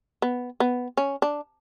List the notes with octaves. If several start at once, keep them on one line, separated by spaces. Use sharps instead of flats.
B3
B3
C#4
D4